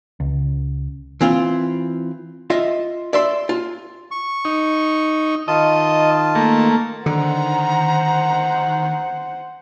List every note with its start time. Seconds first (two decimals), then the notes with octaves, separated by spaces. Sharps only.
0.20 C#2
1.21 E3 C4 F4
2.50 F4 D#5 E5
3.13 D5 E5 C6
3.49 F4
4.11 C#6
4.45 D#4
5.48 D#3 F4 D#5 A5
6.35 A3 A#3
7.06 D3 D#3 C5 F#5 A#5